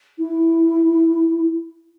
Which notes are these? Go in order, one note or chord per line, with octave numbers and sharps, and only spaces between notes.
E4